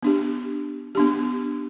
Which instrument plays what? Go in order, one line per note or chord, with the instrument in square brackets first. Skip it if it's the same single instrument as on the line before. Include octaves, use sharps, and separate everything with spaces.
[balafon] B3 D4 G4
B3 D4 G4